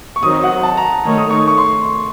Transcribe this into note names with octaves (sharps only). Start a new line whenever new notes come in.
C#6
D#3 F#3 C4 D#4 D#6
F#5
A5
A#5
D#3 A3 D#4 A4 C#5
D#6
C#6
C#6
C6